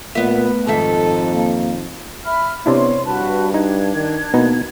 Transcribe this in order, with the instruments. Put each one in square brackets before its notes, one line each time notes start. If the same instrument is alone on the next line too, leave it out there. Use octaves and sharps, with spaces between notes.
[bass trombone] A#2 [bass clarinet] A3 [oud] B3 E5
[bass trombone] F2 [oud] G#2 D#3 E5 [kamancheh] A4
[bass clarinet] A#3
[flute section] E5 B5 F6
[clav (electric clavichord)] C3 D4 E4 [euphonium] B3 [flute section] C#5 C6
[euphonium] G2 [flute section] F#4 B4 A5
[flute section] D4 G#6 [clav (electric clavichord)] D#4
[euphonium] D#3
[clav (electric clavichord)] B2 B3 D#4 [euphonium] A#3